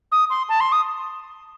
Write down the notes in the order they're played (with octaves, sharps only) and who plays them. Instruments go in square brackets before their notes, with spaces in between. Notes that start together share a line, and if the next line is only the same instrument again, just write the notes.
[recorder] D#6
C6
A5
C6
D#6